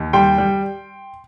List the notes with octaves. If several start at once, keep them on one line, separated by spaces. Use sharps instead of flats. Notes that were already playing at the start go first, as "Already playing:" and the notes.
Already playing: D#2
G3 G5 C6
G3